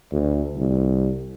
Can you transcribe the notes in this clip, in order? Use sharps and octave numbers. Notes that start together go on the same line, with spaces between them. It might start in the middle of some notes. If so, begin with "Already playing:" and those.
D2
C2